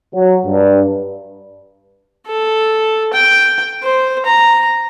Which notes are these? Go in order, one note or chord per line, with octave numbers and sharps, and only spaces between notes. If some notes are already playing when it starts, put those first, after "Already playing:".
F#3
G2
A4
G5
C5
A#5